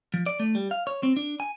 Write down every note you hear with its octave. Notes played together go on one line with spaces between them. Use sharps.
F3
D5
A3
G3
F5
C#5
C4
D4
G#5